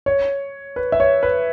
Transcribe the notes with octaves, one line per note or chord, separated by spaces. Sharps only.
C#5
B4
E5
C#5
B4